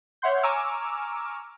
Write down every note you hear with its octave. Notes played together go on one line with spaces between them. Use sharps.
C#5 E5 F#5 C6 G6
G#5 A#5 C#6 D6 E6 F6